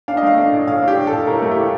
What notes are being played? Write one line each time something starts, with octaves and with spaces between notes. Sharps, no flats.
D4 F5
D#5
A3 F5
D4
A2
A2 F5
D4
G4
A2
A4
A2
A2 A#4
A3 A4
A2 G4